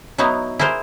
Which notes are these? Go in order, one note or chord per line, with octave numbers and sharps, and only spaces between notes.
F#3 B3 D#4 E4
E4 G#4 A#4 C5 D5